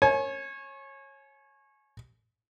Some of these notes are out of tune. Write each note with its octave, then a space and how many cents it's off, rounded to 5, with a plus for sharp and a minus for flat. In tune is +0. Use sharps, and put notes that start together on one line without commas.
C#5 -25 G#5 +30